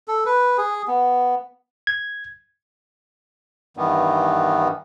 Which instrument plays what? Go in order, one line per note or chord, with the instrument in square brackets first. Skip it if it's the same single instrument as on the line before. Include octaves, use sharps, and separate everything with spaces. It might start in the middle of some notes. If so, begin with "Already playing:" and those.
[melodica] A4
B4
G#4
B3
[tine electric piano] G#6
[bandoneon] G2 D#3 E3 B3